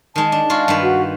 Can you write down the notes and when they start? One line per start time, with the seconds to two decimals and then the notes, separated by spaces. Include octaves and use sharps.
0.16 D#3 G#3 A5
0.32 D4
0.50 G#3 F4 F#4
0.68 G2 D#3 B4
0.82 F#4